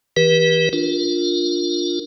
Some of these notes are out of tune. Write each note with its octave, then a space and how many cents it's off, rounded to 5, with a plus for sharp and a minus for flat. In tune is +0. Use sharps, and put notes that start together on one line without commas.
E3 -20 G4 +0 B4 -40
D4 +0 F4 +5 A#4 -5